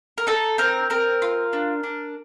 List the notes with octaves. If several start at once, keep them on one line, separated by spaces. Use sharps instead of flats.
A#4
D#4 A4
C4 A#4
C4 A#4
F4
D4
D4